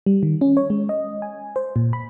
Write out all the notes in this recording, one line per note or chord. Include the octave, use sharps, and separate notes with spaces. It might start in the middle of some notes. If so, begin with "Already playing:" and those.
G3
D#3
C#4
C#5
G#3
D#5
G#5
C5
A#2
B5